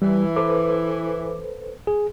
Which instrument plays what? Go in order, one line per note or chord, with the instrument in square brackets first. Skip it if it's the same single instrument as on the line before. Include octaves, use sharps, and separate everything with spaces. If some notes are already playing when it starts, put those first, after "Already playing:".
[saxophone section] E3 [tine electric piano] G3
[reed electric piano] A4 B4 C5 [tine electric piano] D6
[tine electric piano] G#4